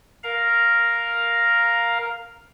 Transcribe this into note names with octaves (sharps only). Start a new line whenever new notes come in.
A#4 F5 A#5